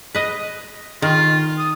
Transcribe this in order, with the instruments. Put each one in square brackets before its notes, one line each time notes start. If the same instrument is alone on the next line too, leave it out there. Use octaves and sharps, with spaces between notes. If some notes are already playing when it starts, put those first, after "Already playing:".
[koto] B4 D#5
[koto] D#3 [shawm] F4
[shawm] D#6